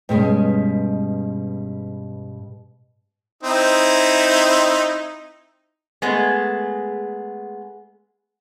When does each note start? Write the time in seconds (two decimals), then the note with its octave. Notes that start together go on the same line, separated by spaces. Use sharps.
0.09 G2 B2 G#3 C#4
3.43 C4 D#4 E4
6.02 G#3 A3 B3 G#4